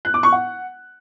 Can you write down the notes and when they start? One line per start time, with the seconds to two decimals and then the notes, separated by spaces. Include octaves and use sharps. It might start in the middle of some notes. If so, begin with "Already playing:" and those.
0.05 F#6
0.14 D6
0.23 C#6
0.32 F#5